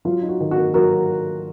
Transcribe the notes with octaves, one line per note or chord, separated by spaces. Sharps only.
F#3 F4
D#4
F#4
D#3
F#4
A#3
F#3 F#4 A#4